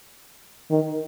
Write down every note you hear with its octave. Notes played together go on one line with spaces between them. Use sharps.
D#3